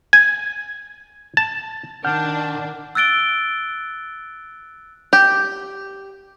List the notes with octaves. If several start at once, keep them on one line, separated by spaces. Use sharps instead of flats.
G#5
A5
D#3 D4 F#5 F6 G6
E6 F#6 A6 D7 G7
G4